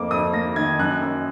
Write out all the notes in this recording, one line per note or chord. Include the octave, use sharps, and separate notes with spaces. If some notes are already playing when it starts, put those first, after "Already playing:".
Already playing: F2 A#3 D6
F2 D#6
A#3 A#6
D#3 G#6
F#2 F#6
F#2